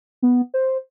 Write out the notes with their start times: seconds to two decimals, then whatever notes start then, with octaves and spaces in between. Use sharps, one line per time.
0.22 B3
0.54 C5